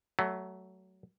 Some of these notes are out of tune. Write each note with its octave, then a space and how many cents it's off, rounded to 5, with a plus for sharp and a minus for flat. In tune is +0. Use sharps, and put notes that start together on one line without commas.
F#3 +20 A3 +0